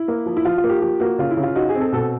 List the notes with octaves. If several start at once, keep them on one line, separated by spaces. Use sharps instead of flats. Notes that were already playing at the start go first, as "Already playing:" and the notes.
Already playing: E4
A#3
F3
E4
F3 F4
F4
A#3
G4
F3 G4
A#3 F#4
C#3 F4
E4
C#3
F4
D#4 F#4
G#4
C4
A4
B2 A4